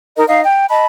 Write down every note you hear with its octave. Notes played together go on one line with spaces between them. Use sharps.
D#4 A#4 D#5
D#4 D#5 F5
G5
D#5 A5 B5